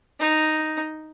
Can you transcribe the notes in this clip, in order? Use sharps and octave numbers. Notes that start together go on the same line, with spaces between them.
D#4